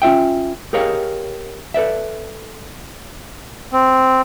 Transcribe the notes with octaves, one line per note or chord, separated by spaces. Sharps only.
C#4 F4 E5 G5
G4 G#4 A#4 C#5 D#5 F5
A4 B4 D5 E5
C4